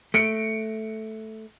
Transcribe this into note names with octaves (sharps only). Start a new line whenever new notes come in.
A3 C#7 D7